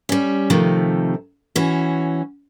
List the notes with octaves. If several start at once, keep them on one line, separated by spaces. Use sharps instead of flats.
G3 C#4
C3 D#3 F3 A3
E3 C#4 F#4